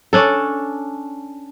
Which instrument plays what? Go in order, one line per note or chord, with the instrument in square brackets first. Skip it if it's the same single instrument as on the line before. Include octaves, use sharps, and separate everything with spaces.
[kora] C#4 D4 A4